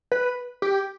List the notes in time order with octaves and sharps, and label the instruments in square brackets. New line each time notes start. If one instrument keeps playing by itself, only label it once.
[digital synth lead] B4
G4